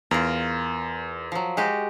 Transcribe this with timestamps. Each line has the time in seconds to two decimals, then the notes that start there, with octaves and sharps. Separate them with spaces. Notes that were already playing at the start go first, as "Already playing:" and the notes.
0.11 E2 F4 A#4
1.32 F3 F#3
1.57 G#3 F#4 G4